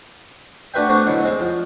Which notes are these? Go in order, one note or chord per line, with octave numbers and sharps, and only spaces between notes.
A3 D4 F#4 B4 E5 G5
A3 B3 C4 D4 F#4
B2 D3 E3 F#3
G#3 C4
F3